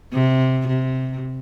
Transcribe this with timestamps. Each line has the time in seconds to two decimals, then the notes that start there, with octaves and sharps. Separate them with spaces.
0.13 C3
0.68 C3